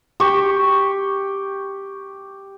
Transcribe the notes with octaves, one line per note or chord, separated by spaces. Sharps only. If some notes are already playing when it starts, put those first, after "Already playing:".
G4 G5 C#6